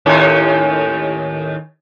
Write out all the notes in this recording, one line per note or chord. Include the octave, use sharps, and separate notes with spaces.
D#2 A2 C#4